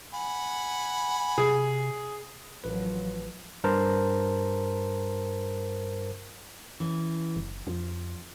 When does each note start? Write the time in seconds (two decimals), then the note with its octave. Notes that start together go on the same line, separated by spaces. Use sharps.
0.14 F#5 G#5 B5
1.38 C3 G#4
2.64 A1 F3 F#3 B4
3.64 G2 A#4 C5 A5
6.80 E3 C#4
7.36 F#1
7.67 F2 F3